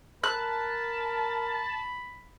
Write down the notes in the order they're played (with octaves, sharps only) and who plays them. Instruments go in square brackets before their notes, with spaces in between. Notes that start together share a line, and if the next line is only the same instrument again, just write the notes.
[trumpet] A#4 [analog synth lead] A5 [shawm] B5 [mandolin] F#6